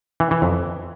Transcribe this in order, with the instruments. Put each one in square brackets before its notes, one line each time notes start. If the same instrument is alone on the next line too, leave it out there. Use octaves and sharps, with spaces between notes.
[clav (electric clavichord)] E3
E3
F2